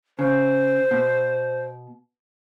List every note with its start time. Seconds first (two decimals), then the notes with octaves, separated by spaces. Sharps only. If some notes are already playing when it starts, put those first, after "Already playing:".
0.19 C#3 C5
0.91 B2